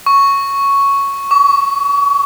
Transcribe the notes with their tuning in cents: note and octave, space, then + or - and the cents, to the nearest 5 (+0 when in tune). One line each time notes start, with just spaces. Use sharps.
C#6 +0
C#6 +35